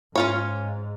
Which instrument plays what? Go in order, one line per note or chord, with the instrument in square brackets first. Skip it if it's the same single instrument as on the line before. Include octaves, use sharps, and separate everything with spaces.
[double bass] G#2 [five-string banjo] C#4 F4 C#5